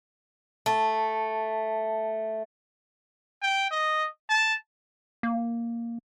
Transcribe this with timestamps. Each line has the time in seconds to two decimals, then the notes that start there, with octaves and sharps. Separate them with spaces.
0.66 A3 A5
3.42 G5
3.71 D#5
4.30 A5
5.23 A#3